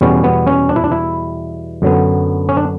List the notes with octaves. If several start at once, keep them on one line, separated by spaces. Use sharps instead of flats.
E2 B2 G3 B3 C#4
B3
C#4
D4
E4
D4
E4
F#2 D3 F#3 B3
C#4
D4